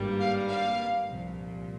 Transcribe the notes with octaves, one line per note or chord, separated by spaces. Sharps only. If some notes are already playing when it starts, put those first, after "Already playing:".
Already playing: G#1 G2 G3 A#3
F5
F5
C2 A#2 F3